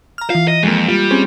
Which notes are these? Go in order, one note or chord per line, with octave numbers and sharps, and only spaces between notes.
A#5 F6
E3 F4 F5
D#5
F2 G#3 A#3
G3 F4
C4 C#4 G#4